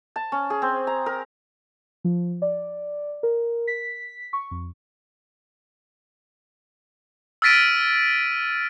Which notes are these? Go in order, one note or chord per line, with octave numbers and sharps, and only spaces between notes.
A5
C#4
G#4
C4
A#5
A#4
F3
D5
A#4
B6
C#6
F2
E6 F6 A6 B6 D7 D#7